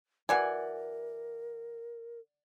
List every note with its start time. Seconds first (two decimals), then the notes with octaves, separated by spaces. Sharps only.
0.29 E3 F#4 A#4 D5 F#5 G#5